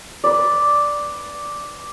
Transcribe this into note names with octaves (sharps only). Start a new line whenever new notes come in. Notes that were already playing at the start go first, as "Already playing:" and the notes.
B4 D5